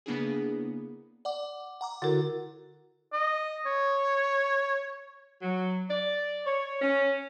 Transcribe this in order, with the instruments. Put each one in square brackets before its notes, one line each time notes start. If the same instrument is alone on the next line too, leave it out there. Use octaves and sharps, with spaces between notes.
[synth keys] C#3 A#3 B3 D4 E4 G#4
[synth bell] D5 F#5 D6
F#5 A#5 D6
[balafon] D3 A#4 [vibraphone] E4 F#4 A4 [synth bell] F#5
[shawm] D#5
C#5
[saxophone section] F#3
D5
C#5
C#4